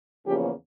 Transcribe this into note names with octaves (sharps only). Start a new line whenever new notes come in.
E2 C#3 F3 A#3 C#4 G4